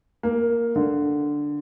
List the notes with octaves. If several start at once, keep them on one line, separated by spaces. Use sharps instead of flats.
A#3
D3